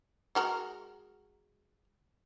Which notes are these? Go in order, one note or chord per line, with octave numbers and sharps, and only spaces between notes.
G#3 F#4 A#4